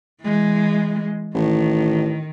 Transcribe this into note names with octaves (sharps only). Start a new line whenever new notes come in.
E3 G#3
A1 D#3